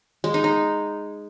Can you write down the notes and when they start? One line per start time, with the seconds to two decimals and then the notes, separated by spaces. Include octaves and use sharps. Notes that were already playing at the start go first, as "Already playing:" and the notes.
0.24 G#3
0.34 D#4
0.44 D#4